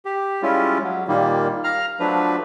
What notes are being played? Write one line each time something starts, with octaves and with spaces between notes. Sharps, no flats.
G4
G3 G#3 C#4 E4 F4
F#3
A#2 D#3 G3 A#3
F5 A#5 F6
F3 F#3 A3 D4 B4